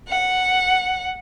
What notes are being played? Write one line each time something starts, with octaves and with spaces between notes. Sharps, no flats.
F#5